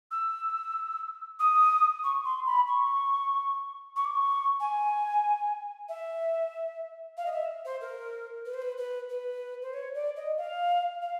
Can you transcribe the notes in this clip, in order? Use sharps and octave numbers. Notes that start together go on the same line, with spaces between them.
E6
D#6
C#6
C6
B5
C#6
C#6
D6
C#6
G#5
E5
F5
D#5
E5
C5
A#4
B4
C5
B4
B4
B4
C5
C#5
D5
D#5
F5
F5